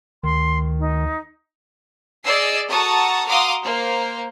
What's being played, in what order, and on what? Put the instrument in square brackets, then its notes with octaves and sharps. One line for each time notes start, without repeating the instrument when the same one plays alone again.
[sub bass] D2 [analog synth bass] D#3 [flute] C6
[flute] D#4
[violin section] G#4 D5 D#5 E6 C7
F#4 A4 A5 A#5 C#6 D#6
F#4 F5 A#5 C6 D6 D#6
A#3 C5